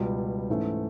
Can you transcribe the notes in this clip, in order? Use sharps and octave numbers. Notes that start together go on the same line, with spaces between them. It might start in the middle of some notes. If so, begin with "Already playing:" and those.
Already playing: C#2 B2 G3
G#2 E3 A3 C#4